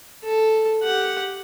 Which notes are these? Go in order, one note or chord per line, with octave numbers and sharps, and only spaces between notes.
A4
G4 F#5